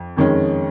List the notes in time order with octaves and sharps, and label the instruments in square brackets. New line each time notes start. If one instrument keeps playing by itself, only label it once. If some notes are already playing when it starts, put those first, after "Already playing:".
Already playing: [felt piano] F2
F2 D#3 G#3 C#4